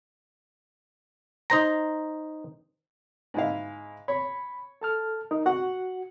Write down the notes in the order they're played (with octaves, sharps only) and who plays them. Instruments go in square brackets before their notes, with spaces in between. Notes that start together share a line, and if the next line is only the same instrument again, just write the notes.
[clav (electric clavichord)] D#4 C5 A#5
[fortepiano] G#2 E4 F5
[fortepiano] C#5 [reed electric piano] B5
[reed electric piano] A4 A5 F6
D#4 A#4
[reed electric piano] F#4 [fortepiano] F#5